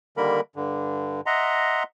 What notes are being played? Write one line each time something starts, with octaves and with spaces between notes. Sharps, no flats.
D3 D#3 G3 A#3 A#4 B5
G2 D3
D#5 E5 F#5 A#5 C6